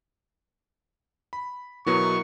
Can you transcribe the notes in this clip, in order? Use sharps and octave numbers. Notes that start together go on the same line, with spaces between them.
B5
B2 F#3 B3 E4 A#4 C#6